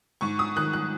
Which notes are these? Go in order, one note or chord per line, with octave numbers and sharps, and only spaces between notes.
G#2 C#6
D#6
D#3 F#6
F#6